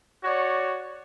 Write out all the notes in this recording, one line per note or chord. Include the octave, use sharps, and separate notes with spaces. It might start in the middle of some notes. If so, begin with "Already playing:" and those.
F#4 C#5 D5